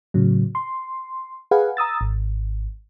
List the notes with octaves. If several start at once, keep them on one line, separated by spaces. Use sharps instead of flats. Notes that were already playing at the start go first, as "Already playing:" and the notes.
A2 C#3 F#3
C6
G#4 B4 F5 F#5 G#5
A#5 D#6 E6 A6
G#1